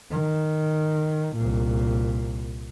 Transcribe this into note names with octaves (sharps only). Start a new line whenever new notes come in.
D#3
C2 A#2